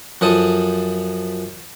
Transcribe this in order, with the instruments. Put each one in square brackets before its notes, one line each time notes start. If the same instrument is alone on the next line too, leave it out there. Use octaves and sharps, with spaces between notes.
[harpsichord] F#2 F3 A4 D#6